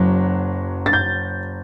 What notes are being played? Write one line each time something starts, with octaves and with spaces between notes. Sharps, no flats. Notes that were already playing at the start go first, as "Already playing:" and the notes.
Already playing: F#1 F#3
A6
G6